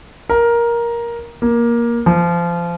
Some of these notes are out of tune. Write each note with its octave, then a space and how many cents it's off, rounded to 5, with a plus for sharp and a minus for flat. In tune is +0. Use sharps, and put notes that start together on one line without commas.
A#4 +10
A#3 +15
F3 -25